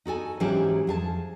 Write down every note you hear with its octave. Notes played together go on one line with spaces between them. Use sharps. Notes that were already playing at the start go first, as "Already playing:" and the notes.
D#4 F#4 A4 G#5
G#2 E3 F#3 C#4 G4 G#4
F2 G#4 A5